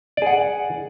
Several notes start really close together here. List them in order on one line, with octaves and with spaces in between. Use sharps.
D5 G#4 F#5